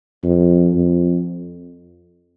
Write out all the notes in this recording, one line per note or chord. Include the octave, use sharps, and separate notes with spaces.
F2
F2